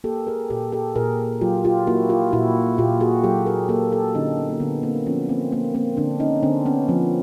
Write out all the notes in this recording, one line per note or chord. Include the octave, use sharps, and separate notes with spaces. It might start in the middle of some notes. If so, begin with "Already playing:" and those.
A#3 G4 A4
G#4 A#4
A#2 G4 A4
G4 A4
A#2 G#4 A#4
F#3 F4 G4
F4 G4
A#3 E4 F#4
F4 G4
A#2 E4 F#4
A#2 F4 G4
F#4 G#4
F#3 G4 A4
G#4 A#4
A#3 G4 A4
G4 A4
D3 C#4 D#4
B3
A#3
D3 B3
A#3 C4
F3 B3 C#4
A#3 C4
A#3 C4
A#3 C4
D3 C4 D4
C#4 D#4
D3 C4 D4
B3 C#4
F3 A#3 C4